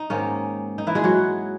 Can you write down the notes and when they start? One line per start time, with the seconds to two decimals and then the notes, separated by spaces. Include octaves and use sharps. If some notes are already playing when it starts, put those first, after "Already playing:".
Already playing: D#4
0.10 G#2 D#3 A#3 C#4
0.78 D#4
0.87 E3 E4
0.95 G#3 G#4
1.04 F#3 F#4